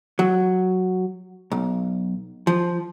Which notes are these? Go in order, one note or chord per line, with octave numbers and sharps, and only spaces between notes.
F#3
B1
F3